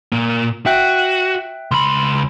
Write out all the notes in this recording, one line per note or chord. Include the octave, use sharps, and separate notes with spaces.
A#2 A#3
F#4 E5 G5 F#6
C#2 B5 C6